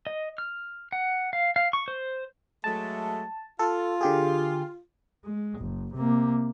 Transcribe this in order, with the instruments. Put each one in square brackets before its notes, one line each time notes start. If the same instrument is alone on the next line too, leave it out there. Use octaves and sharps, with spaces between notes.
[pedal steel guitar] D#5
F6
F#5
F5
F5
C#6
C5
[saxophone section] F#3 G#3 A3 [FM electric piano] A5
[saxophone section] F4 [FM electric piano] A4
[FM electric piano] D3 G4 G#4
[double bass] G#3
F#1
C3 A#3